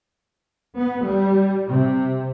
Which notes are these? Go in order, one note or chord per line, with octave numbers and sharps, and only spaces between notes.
B3
G3
C3